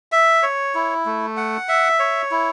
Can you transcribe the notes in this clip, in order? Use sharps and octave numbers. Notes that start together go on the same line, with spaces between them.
E5
C#5
E4
A3
F#5
E5
C#5
E4